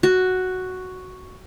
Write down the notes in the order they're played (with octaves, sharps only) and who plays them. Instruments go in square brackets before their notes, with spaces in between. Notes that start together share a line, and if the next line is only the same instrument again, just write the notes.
[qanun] F#4